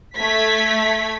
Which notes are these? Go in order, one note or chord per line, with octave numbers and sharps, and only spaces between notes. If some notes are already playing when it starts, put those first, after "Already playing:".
A3 G#6 B6